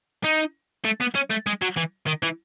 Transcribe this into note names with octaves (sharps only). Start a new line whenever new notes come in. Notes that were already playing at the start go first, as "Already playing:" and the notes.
D#4
A3
B3
C#4
A3
G#3
F#3
E3
D#3
E3